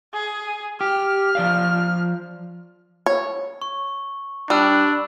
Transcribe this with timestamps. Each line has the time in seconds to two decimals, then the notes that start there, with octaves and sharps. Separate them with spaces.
0.14 G#4
0.81 G4 F6
1.35 F3 D5 F5
3.06 C#5
3.62 C#6
4.50 G3 D4 B5 E6 F#6